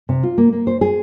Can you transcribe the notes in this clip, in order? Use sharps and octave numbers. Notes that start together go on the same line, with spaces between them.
C3
F4
A#3
A#3
C5
G#4